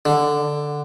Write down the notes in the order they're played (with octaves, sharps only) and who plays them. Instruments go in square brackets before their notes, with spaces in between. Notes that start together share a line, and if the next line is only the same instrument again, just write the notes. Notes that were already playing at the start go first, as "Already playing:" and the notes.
[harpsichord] D3